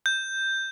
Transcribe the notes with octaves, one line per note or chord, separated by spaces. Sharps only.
G6